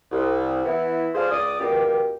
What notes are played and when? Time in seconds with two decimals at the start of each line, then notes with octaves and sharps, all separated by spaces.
0.12 C2
0.65 E3 B3 E4
1.15 F4 G#4 A4 C5 D5 F5
1.31 C#2 D5 D6 D#6
1.60 C#2 B2 A#3 G4